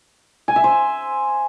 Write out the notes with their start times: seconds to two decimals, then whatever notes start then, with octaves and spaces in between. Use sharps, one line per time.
0.48 G#5
0.56 E5
0.64 C5